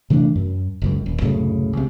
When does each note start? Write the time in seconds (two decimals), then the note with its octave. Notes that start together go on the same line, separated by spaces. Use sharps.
0.10 C3 E3 A3 D4
0.35 F#2
0.82 F#1 C#2 F#2
1.06 D#1
1.22 C2 F#2 A2 C#3
1.73 C#2 C3